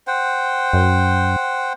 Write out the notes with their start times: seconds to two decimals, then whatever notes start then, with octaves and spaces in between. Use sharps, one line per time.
0.07 C5 F#5 G5
0.73 F#2